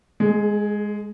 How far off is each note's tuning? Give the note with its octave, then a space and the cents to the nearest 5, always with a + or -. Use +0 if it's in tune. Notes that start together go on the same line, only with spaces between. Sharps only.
G#3 +0 G#4 +45